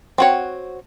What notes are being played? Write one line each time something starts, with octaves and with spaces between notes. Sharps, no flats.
C4 F#4 C#5